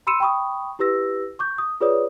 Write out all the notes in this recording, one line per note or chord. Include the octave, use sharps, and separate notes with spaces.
B5 C6 E6 C#7 D#7 E7
G5 B5 C#6 D#6
E4 G4 B4 E6 A#6
C#6 D6 G6
D#6
F4 G#4 B4 C#5 D5 D#6